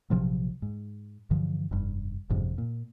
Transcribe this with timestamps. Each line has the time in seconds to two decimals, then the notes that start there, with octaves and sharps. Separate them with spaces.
0.10 A#1 C3 F3 F#3
0.62 G#2
1.31 G2 D3 E3 F3
1.71 F1 G2
2.30 G1 F2 G#2 C3
2.58 A#2